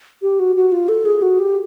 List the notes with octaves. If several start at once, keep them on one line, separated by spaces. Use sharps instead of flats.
G4
F#4
F#4
F4
A4
G#4
F#4
G4